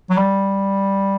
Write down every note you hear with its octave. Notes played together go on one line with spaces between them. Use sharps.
F#3
G3